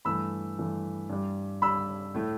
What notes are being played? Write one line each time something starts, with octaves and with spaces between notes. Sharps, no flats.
G2 E3 A3 B5 E6
G2 E3 A3
G2 G3
G2 G3 B5 E6
A2 A3